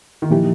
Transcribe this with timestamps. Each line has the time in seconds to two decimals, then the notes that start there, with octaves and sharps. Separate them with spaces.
0.22 D#3
0.30 A#2 E3 F3 A#3 D#4 G4